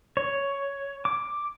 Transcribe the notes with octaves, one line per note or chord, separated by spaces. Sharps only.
C#5
D6